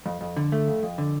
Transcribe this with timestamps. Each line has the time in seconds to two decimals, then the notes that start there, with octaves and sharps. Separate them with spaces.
0.06 F2
0.21 F2
0.36 D3
0.52 A3
0.67 F2
0.83 F2
0.98 D3